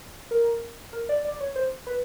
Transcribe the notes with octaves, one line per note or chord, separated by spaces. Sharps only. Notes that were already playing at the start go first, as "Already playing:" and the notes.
A#4
A#4
D5
D5
C#5
C5
B4